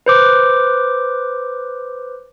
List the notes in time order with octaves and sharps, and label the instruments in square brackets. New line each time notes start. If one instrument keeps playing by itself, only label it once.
[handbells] B4 C5 D6